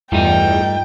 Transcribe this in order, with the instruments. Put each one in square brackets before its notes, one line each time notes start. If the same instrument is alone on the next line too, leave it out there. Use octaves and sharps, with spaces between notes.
[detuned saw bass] E2 [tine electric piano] G2 F4 A4 [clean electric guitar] G3 A3 D#4 [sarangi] G5